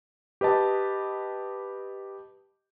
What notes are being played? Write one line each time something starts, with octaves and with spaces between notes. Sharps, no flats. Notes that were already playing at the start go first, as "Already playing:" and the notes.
G4 B4 D#5 A5